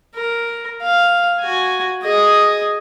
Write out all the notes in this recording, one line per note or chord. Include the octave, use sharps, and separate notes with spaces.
A#4
F5
F#4 G#5
G#4 D#5